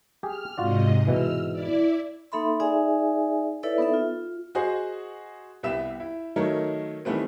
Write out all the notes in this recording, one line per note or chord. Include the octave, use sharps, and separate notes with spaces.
G4 G#4 F6
G#2 C3 F4 F#4 D5 D#5
G#2 B2 E3 E6 F6
E4 D5
A#3 D#4 A4 E5 B5 C6
D#4 G#4 D5 E5 G#5
E4 A4 B4 C#5 D5 E5
B3 D#4 A4 E5
F4
F#4 G#4 C5 D#5
C2 B3 G4 E5 E7
E4
D#3 F#3 A3 D#4 A#4 C#5
D#3 E3 G3 A3 B3 C4